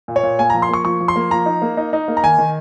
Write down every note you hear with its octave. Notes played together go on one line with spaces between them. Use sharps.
A#2
C#5
A#2
A#3 G#5
F3 A#5
C6
A#3 C#6
F3 C#6
F3
C6
A#3
F3 A#5
D#4
A#3
D#4
D#4
A#3
A#5
D#3 G#5
D#3